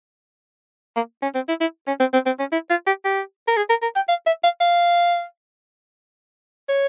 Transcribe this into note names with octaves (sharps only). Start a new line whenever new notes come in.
A#3
C#4
C4
E4
E4
C#4
C4
C4
C4
C#4
E4
F4
G4
G4
A#4
G#4
A#4
A#4
G5
F5
E5
F5
F5
C#5